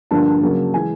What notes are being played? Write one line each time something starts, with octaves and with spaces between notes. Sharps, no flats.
G2 D3 F3 A#3 A5
C#3 F#3 A#3
E3 G#3 G#5